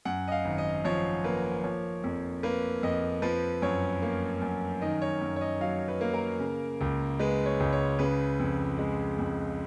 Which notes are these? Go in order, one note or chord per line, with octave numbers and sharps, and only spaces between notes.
F#2 F#5
D#5
F5
G#1
D#5
F3 C#5
A#3 B4
F3 C#5
F2
A#3 B4
F2 D#5
F3 B4
F#2 C#5
A#3
F#2
D#3 D#5
C#5
F#2
C#5
D#5
F#3 F5
B4
A#3
A#4
C#3
C#2
G#3 B4
C#5
C#2
C#5
C#3 B4
F2
G#3
F2